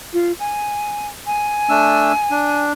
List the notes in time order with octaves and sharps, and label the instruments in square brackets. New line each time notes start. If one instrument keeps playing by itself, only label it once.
[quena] F4
G#5
G#5
[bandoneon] A3 D4 E6
D4